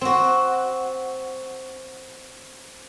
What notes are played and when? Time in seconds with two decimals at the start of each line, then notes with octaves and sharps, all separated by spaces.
0.01 C4 F#4